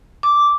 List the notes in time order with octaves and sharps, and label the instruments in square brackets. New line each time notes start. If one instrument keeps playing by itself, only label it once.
[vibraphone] D6